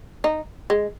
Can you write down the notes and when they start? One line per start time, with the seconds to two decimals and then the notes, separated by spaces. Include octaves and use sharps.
0.24 D#4
0.70 G#3